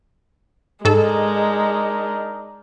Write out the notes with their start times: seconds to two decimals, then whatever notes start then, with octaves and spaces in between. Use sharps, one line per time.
0.85 G#2 G#3 D4 D#4 A4 A#4